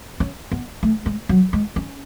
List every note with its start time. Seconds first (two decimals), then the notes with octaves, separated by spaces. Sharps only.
0.20 C#4
0.52 B3
0.83 A3
1.06 G#3
1.29 F#3
1.53 G#3
1.76 C#4